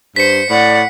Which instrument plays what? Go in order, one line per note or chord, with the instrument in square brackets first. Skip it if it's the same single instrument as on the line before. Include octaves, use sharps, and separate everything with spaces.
[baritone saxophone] G2 [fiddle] C5 [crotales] B6 C#7
[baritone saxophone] A2 [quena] D5 [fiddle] F#5